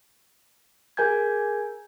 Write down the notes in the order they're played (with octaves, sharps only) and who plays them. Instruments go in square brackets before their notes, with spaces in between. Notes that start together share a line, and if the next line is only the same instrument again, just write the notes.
[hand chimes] G#4 A#4 G#5 G6 G#6